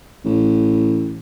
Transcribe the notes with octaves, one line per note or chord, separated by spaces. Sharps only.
A1